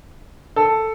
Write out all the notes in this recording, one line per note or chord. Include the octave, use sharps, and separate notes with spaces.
A4